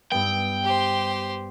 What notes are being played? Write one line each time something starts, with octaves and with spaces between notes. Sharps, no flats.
G2 B3 G5
G4 C5